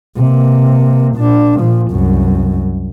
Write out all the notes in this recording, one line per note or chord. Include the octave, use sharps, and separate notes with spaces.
C3 A#3
A#2 D4
A#2 F3
C2 F#2